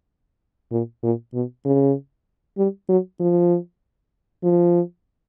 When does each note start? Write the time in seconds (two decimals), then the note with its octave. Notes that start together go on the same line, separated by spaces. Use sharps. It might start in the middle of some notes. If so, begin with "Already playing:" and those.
0.71 A#2
1.03 A#2
1.33 B2
1.65 C#3
2.57 G3
2.89 F#3
3.20 F3
4.43 F3